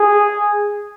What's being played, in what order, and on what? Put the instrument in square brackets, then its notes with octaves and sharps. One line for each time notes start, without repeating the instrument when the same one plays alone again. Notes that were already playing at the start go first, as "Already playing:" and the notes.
Already playing: [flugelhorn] G#4